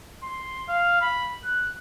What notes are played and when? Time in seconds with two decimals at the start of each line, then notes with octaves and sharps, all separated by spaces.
0.23 C6
0.69 F5
1.01 B5
1.44 F#6